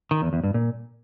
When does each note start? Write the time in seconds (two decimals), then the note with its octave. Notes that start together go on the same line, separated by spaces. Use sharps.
0.11 D#3
0.22 E2
0.33 E2
0.44 G2
0.54 A#2